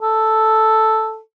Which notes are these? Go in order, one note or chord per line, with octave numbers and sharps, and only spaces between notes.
A4